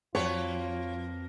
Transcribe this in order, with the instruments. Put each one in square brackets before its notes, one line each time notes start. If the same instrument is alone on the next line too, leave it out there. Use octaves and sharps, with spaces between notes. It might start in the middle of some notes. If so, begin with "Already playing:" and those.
[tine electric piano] F2 C4 A5 [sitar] F3 A#3 B4 [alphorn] F4 [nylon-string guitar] C#5